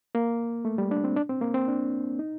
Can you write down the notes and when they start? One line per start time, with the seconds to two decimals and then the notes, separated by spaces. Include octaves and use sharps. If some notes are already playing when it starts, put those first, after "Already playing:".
0.15 A#3
0.65 A3
0.78 G3
0.91 D4
1.04 C4
1.16 D4
1.29 C4
1.41 A#3
1.54 C4
1.68 D4
2.19 D#4